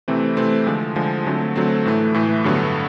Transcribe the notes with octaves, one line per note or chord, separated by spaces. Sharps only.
C3 E3 A3 C4
C3 E3 A3 C4
D3 F3 G#3
D3 F3 G#3
D3 F#3 A3 C4
D3 F#3 A3 C4
A2 E3 A3
A2 E3 A3
G2 D3 F#3 B3